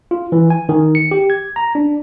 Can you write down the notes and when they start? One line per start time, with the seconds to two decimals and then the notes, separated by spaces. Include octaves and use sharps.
0.11 F4
0.32 E3
0.50 G#5
0.69 D#3
0.95 C#7
1.11 G4
1.30 G#6
1.56 A#5
1.75 D4